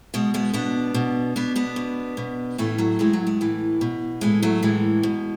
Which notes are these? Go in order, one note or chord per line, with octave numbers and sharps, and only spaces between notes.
B2 G#3
G#3 B3
B2 B3 D4
B2
B2 B3 D4
B3 D4
B2
B2
A2 E3 A3 C#4
F#3 A3
A2 E3 G#3
F#3
G#3
A2 E3
B2
A2 E3 G#3
F#3 A3
A2 E3 G#3
B2